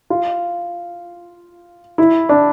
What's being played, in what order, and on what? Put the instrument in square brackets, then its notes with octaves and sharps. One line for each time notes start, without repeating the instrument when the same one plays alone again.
[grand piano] F4
E4
D4